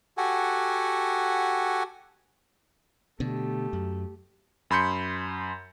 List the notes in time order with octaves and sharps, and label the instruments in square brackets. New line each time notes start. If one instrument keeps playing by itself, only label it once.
[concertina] F#4 G4 A4 F#5 G#5
[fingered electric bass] B2 D3 [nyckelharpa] A3 G4
[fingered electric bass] F#2
[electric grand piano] F#2 B5 C6 G6 C#7